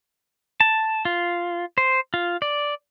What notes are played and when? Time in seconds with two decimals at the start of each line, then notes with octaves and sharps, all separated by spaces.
0.61 A5
1.05 F4
1.78 C5
2.14 F4
2.42 D5